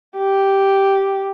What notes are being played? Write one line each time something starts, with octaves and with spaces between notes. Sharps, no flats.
G4